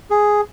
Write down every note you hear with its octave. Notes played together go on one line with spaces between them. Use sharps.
G#4